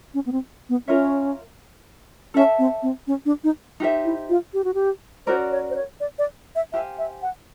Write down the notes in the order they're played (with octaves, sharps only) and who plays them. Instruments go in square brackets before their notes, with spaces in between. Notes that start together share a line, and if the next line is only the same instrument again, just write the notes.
[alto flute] C#4
B3
C4
B3
[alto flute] C#4 [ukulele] F4 A#4 C#5 E5
[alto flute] C#4 [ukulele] A4 C#5 E5 A5
[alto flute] C4
C4
C#4
D4
D#4
[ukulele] D#4 G4 C5 E5
[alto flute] E4
F4
G4
F#4
G4
[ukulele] C#4 F#4 A#4 D5 [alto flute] C5
[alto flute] C#5
C5
C#5
D5
D5
E5
[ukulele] G4 C5 F5 G#5 [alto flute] E5
[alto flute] E5
F#5